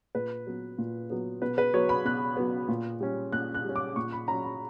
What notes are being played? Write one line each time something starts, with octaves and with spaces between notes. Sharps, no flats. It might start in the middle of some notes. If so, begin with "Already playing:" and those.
A#2 B4
F#3 B3
A#2
F#3 B3
B2 B4
B4
F#3 B3 C#5
B5
B2 F#6
F#3 B3
A#2
G3 C#4
A#2 F#6
F#6
G3 C#4
D6
A#2 C#6
B5
F#3 C#4 A#5
B5